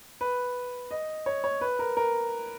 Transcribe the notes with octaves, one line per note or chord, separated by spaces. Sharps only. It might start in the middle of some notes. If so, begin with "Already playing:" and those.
B4
D#5
C#5
C#5
B4
A#4
A#4